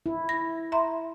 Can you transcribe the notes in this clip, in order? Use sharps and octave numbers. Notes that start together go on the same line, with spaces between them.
E4
A#6
E5 A#5 C6